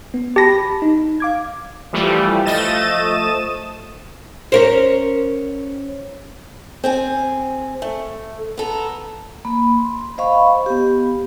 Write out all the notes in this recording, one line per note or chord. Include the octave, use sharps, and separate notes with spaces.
B3
G4 A5 B5 A#6
D#4
F5 D6 G#6
E3 F3 G3 A3
F3 A3 D#5 A6 D#7 E7
C#4 A#4 C5
C4 G#4 G#5
A3
B3 A4 A#5
A#3 B5
C6
C5 D#5 F5 B5 C#6
B3 G4